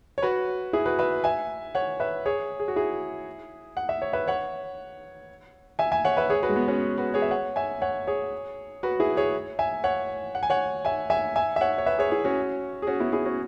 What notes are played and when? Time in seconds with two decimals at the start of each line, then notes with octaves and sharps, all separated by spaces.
0.18 C#5
0.23 F#4 B4
0.73 E4 G#4
0.86 F#4 B4
0.99 B4 E5
1.24 E5 G#5
1.75 C#5 F#5
2.00 B4 E5
2.25 G#4 C#5
2.60 G#4
2.68 F#4
2.76 E4 G#4
3.77 F#5
3.89 E5
4.02 C#5
4.13 B4 E5
4.28 C#5 F#5
5.79 E5 G#5
5.92 E5 G#5
6.05 C#5 F#5
6.17 B4 E5
6.30 G#4 C#5
6.43 F#4 B4
6.49 G#3
6.56 B3
6.68 C#4 F#4
6.98 F#4 B4
7.14 G#4 C#5
7.22 E5
7.31 C#5 F#5
7.56 E5 G#5
7.82 C#5 F#5
8.07 G#4 C#5
8.83 F#4 B4
9.00 E4 G#4
9.17 G#4 C#5
9.59 E5 G#5
9.84 C#5 F#5
10.35 F#5
10.43 G#5
10.50 C#5 F#5
10.85 E5 G#5
11.10 E5 G#5
11.36 E5 G#5
11.56 E5
11.61 C#5 F#5
11.78 C#5
11.86 B4 E5
11.98 G#4 C#5
12.11 E4 G#4
12.24 C#4 F#4
12.82 G#4
12.87 C#4 F#4
13.00 B3 E4
13.12 E4 G#4
13.25 C#4 F#4